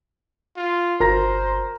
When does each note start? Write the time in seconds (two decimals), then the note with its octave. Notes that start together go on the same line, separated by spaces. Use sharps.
0.57 F4
1.00 G1 A#4 C5 A#5 A#6